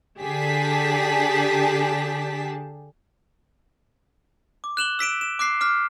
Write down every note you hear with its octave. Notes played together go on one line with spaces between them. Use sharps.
D3 G4 G#4 A5 B6
D6
F#6 E7 F#7 G7
E6 B6 D7 E7
E7
D6 F#6 B6 C7
D6 F6 B6